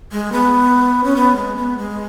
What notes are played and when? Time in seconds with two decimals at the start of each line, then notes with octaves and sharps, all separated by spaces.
0.12 G#3
0.32 B3
1.04 C#4
1.16 B3
1.36 G#3
1.56 B3
1.78 G#3